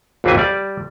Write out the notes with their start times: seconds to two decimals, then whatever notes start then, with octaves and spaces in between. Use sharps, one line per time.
0.24 G#1 D#2 E3 C4 B4 G#5
0.38 G3 D5